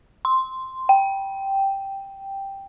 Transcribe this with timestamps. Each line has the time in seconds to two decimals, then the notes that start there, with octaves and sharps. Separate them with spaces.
0.25 C6
0.89 G5